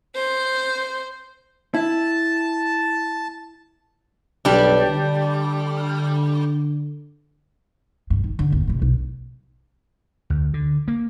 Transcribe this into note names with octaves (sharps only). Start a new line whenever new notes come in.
C5
E4 A5
B1 G3 D4
D3
G2
D#3
D3
G1 D#2
A2 C3
B1
D2
D3
A#3